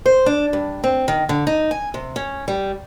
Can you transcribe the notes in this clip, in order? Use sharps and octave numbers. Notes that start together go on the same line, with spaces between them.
C5
D4
G2
C4
D#3
D3
D#4
G#5
C3
C#4
G3